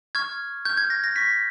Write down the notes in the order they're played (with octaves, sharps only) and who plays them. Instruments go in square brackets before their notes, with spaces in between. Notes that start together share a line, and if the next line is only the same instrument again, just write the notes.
[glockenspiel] C#6 F6 G#6
C#6 F6 G6
G#6
A#6
A#6
C#6 F6 B6